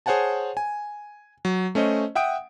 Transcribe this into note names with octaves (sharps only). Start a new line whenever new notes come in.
G#4 C5 C#5 F#5 G#5 A5
G#5
F#3
A3 C#4 C5 D#5
E5 F#5 G5 D#6 D7